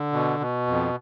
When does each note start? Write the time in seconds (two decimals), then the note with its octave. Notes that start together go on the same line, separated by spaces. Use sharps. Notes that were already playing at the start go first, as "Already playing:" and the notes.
Already playing: D3
0.12 B2
0.40 B2
0.67 F2